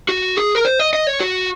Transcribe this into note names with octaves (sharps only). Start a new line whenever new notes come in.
F#4
G#4
A#4
C5
D#5
D#5
C#5
F#4